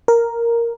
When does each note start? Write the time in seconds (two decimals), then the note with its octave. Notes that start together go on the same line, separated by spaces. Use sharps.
0.08 A#4